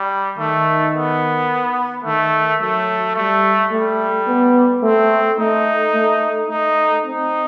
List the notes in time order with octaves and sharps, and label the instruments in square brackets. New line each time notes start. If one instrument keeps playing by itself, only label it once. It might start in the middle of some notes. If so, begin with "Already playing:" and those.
Already playing: [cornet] G3
[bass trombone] D#3 [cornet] A3
[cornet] B3
[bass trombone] D#3 [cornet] A3
[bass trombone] F#3 [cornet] A3
[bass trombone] G3 [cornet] A3
[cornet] G3 [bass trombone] A3
[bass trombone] B3
[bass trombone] A3 [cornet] C4
[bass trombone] A3 [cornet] D#4
[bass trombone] A3
[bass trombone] A3 [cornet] D#4
[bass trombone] C4 [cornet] D#4